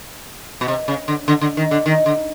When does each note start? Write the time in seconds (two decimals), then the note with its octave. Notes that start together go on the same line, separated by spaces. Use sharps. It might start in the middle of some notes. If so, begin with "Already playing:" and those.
0.61 B2
0.68 C3
0.88 C#3
1.08 D3
1.28 D3
1.41 D3
1.57 D#3
1.71 D3
1.86 D#3
2.06 D3